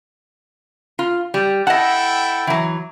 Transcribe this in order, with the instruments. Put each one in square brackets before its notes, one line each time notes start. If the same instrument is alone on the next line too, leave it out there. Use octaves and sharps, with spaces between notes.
[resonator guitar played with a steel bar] F4
G3
[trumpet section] E4 A4 G5 [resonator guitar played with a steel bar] D#5 A5 [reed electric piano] F#5
[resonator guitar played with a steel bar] E3 F#3